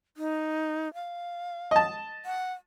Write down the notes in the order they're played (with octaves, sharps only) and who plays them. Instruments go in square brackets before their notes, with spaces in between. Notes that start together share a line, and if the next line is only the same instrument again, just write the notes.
[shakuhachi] D#4
F5
[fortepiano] D#5 A5
[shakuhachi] F#5